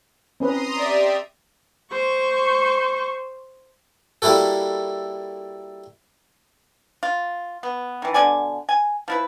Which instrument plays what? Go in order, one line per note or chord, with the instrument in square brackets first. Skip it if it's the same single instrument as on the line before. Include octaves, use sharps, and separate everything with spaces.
[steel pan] C4 C#4 B4 [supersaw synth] A#5 C6 D#6
[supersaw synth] G4 [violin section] D5 E5
[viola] C5 C#6
[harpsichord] G3 A#3 E4 F#4 A4
[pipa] F4
B3
D#3 E3
B2 D3 D5 G#5
G#5
F3 E4 B4